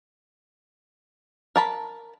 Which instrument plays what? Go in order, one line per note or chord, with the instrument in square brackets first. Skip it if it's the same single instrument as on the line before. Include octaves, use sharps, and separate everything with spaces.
[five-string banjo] A#4 A5 B5